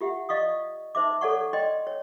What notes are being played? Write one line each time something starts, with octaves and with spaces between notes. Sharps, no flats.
F4 G4 E5 F#5
D5 D#5 F5 C#6 D#6
D#4 C5 E5 D6
A4 C#5 D5 F#5 C#6
D5 D#5 G5 C6
C#5